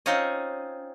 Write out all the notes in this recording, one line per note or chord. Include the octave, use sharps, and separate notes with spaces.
C4 C#4 D#4 F4 C#5 D#5